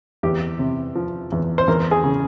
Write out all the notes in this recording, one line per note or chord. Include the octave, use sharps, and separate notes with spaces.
E2 G4
C3
F3
E2
C5
E2 A#4
G#4
C#3